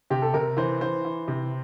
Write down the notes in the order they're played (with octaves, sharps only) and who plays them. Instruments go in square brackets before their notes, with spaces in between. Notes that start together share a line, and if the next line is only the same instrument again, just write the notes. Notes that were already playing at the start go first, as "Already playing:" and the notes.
[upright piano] C3 G4
A4
C3 A#4
E3 C5
E3 C5
E3
C3